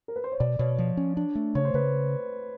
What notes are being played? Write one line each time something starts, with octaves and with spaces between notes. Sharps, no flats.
A#4
B4
C5
C#5
B2 D5
B2 C#5
F3
C#4
D4
A3
C#3 C#5
C5
C#3 B4